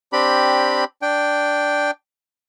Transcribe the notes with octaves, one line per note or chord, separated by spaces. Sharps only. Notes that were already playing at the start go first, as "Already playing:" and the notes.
C4 D4 G4 B5
D4 G5